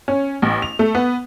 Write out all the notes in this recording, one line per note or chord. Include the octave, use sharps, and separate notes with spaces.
C#4
A1
F7
A3
B3